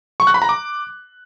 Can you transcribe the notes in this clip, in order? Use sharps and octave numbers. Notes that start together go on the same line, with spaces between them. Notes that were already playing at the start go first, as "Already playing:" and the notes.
C#6
F#6
B5
A#5
D6